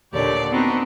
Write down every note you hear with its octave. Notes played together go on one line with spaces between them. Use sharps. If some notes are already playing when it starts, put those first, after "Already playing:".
D#2 A#2 D3 G4 C#5 D5
B3 C4 D4 D#4 F#4